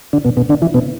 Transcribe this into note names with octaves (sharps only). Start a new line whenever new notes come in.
D3 D4
B2 B3
B2 B3
D3 D4
E3 E4
B2 B3